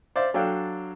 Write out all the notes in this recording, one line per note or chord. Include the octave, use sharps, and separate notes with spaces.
C5 D5 E5 F5
F#3 D4 A4 F5 G5